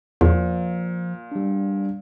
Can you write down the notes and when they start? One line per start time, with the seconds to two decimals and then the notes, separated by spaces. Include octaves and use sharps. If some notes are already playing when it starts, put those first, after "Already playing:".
0.21 E2 A#2 F3
1.32 G3 D4